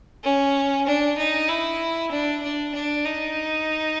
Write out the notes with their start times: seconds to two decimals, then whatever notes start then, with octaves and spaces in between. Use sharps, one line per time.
0.24 C#4
0.87 D4
1.18 D#4
1.49 E4
2.12 D4
2.43 D4
2.74 D4
3.06 D#4